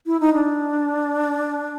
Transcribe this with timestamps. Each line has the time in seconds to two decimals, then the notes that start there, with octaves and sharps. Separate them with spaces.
0.06 E4
0.20 D#4
0.34 D4